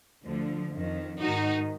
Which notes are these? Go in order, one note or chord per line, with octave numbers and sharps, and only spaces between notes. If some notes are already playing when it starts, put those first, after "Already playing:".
D2 D3 F3
F2 D#3
G#2 D#3 D#4 F#4